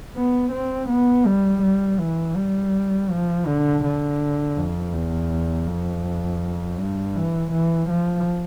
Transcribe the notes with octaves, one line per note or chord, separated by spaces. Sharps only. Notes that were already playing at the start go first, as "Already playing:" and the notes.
B3
C4
B3
G3
G3
E3
G3
F3
D3
D3
F2
E2
F2
G2
E3
E3
F3